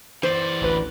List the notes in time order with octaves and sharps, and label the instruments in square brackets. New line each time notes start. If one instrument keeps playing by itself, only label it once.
[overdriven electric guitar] E3 D5 [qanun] C5
[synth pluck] A1 D2 B4